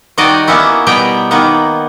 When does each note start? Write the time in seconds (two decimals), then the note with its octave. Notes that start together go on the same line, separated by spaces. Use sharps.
0.18 D#3 G3 F#4 D5 D#5
0.47 A#3 B3 C#4 E4 F#4
0.87 B2 G3 B3 G5 A#5
1.31 D#3 A#3 B3 F#5